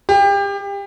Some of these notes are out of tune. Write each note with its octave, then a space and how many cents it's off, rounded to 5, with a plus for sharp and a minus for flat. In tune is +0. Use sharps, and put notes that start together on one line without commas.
G4 +30